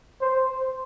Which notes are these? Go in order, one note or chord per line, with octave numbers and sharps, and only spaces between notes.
C5